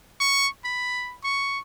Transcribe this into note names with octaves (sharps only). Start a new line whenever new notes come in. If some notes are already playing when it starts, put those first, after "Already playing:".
C#6
B5
C#6